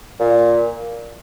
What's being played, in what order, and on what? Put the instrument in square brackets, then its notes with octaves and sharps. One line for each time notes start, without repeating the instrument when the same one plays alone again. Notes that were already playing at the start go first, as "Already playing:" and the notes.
[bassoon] A#2